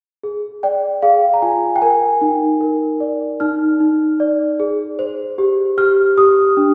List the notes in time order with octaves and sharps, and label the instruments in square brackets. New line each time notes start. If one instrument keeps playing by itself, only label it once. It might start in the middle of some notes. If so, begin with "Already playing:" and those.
[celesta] G#4
D5 G5
G#4 F5
A#5
F4 G#5
G5
A#4 G#5
D#4
A#4
D5
D#4 F6
D#4
D5
G#4
C5
G4
G4 F6
G4 D#6
D4